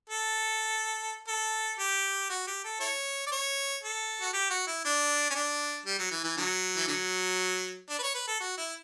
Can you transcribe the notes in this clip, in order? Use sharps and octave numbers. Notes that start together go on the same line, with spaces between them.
A4
A4
G4
F#4
G4
A4
E4 A4 C#5
D5
C#5
A4
F#4
G4
F#4
E4
D4
C#4
D4
G3
F#3
E3
E3
D3 F#3
E3
D3 F#3
D4
B4
C#5
B4
A4
F#4
E4